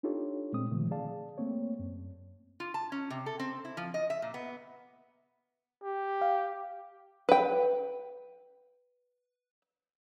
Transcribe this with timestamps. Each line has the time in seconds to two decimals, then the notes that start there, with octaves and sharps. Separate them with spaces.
0.03 D4 D#4 F4 G4 A4 C#5
0.53 A#2 G#3 C4 D#6
0.71 A#2 D3 D#3 F3 A3
0.91 G#4 D5 F5 A5
1.38 A3 A#3 C4 C#5
1.79 F#2
2.60 F4
2.74 A5
2.92 C#4
3.10 C3
3.26 A4
3.40 C4
3.65 E4
3.77 F3
3.94 D#5
4.10 E5
4.22 A#2
4.34 B3
5.83 G4
6.21 F5
7.29 B4 G5